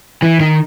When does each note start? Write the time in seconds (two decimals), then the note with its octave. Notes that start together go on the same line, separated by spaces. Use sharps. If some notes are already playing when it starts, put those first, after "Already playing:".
0.22 E3
0.40 D#3